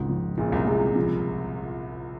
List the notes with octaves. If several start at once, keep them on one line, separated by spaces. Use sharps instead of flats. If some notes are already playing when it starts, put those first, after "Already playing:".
Already playing: G#1 C#2 G#2
F3
A#1 A#2 G#3
C#3
C2 C3
C2 C3 G#3
F3